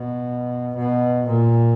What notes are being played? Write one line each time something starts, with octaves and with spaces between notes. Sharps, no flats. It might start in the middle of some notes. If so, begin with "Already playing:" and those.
Already playing: B2
B2
A#2